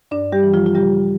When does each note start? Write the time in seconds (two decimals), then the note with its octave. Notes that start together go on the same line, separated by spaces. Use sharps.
0.11 G2 D4 D5
0.32 G3 G4
0.43 E3
0.54 F3 F4
0.66 F4
0.74 C#3 G3 G4